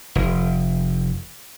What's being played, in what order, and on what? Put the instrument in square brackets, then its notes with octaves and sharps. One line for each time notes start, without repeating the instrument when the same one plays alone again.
[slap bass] F1